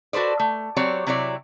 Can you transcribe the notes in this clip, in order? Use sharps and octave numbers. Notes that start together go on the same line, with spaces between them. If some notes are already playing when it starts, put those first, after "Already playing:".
F#4 A4 B4 C5 D5
A3
F#3 C4 G4 C#5 D5
C3 F#3 E4 C#5 D5